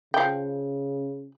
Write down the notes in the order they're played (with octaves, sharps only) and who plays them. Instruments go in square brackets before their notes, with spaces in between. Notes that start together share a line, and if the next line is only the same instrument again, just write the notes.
[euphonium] C#3 [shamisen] F3 G5